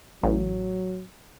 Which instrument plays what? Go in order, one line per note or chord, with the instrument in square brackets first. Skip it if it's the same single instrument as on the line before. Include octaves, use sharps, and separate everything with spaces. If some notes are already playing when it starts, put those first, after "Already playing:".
[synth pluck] A1 [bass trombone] F#3